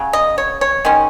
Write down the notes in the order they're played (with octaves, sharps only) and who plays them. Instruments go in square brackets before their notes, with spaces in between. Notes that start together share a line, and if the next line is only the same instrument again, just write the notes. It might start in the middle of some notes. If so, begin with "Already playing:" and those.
Already playing: [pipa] C#3 F#3
D#5
C#5
C#5
D#3 G#3 C#4